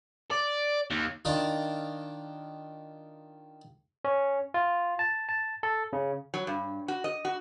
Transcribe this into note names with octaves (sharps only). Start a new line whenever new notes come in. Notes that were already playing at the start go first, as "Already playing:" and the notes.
D5
D#2
D#3 D4 F4
C#4
F4
A5
A5
A4
C#3
F#3
G2
F#4
D#5
F#4